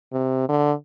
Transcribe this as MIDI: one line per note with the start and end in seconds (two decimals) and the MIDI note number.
0.13 0.45 48
0.49 0.72 50